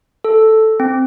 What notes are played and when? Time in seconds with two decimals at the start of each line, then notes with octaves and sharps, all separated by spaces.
0.25 A4
0.80 C4